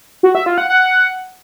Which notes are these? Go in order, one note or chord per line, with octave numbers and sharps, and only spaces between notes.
F#4
E5
F4
F#5
F#5